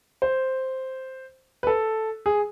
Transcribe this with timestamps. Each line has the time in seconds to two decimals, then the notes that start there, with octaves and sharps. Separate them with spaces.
0.22 C5
1.63 B4
1.67 A4
2.26 G#4